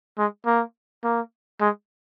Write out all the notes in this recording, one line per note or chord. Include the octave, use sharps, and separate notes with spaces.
G#3
A#3
A#3
G#3